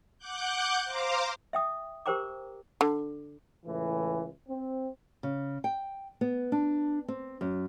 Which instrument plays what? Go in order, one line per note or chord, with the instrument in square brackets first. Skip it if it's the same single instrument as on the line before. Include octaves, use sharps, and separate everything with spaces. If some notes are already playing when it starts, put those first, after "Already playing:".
[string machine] F#5 D6 F#6 G6
C5 F5 A#5 C6 D6
[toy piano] E5 G5 D#6
G4 A#4 C5 G5 A#5 D6
[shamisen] D3
[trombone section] C#2 A2 E3
C4
[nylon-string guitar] C#3
G5
B3
D4
C4
F#2